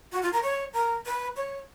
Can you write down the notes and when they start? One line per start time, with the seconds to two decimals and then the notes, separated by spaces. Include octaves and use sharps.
0.12 F#4
0.22 F4
0.33 A#4
0.42 C#5
0.73 A#4
1.05 B4
1.36 C#5